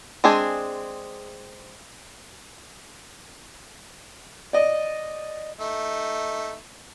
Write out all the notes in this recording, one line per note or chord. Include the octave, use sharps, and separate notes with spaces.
G#3 C4 D4 G#4
D5 D#5
A3 D#4